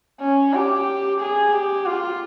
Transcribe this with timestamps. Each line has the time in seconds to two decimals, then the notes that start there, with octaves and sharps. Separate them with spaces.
0.20 C#4
0.53 G4
1.20 G#4
1.52 G4
1.86 F4